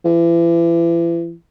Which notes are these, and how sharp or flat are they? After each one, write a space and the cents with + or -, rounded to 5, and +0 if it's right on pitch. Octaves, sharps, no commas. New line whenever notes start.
E3 +35